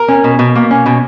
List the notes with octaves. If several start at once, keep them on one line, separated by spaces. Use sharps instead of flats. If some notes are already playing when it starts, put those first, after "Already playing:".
Already playing: A#4
C#4
B2
B2
A#3
C#4
B2